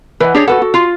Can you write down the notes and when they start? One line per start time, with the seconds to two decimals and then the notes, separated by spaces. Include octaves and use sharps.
0.20 E3 B4 D#5 F#5
0.35 D4 G4 G#4 C#5
0.48 F#4 A4 B4 F#5
0.62 F#4
0.74 F4